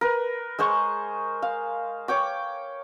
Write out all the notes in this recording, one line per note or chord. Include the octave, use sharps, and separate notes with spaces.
A#4 B4
G#3 G#4 C5 C#6
F5
C#5 G5 D6